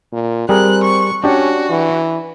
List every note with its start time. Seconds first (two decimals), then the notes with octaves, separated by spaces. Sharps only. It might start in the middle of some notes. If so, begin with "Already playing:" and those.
0.12 A#2
0.49 G3 C4 G#4 A#4 F#6
0.84 C#6
1.24 C#4 D4 F#4 G4 D5
1.70 E3